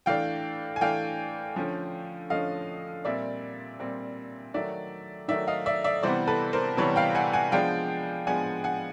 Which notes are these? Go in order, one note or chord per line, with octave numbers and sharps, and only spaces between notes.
E3 A3 D4 F5 G5
G#5
E3 A3 D4 F5 G5
D3 F3 A3 C#4
D3 F3 A3 C#4 D#5 F5
A#2 G3 C4 D5 E5
A#2 G3 C4
D#3 F#3 A3 D5 E5
D#3 F#3 A3 D5 E5
D#5 F5
D5 E5
D5 E5
C3 E3 G3 B3 C5 D5
A4 B4
A#4 C5
C3 E3 G3 B3 B4 C#5
F5 G5
F#5 G#5
F#5 G#5
F3 G#3 B3 D4 F5 G5
F3 G#3 B3 D4 F#5 G#5
F#5 G#5